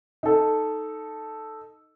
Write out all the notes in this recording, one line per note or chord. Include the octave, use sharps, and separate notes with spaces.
D#4 A4